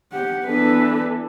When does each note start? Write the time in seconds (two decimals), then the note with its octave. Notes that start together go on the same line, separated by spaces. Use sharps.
0.12 G4 F#5
0.45 E3 B3 D4 A4 B4